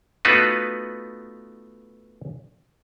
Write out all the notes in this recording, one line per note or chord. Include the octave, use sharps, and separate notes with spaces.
A3 B3 D#4 F4 F#4 B4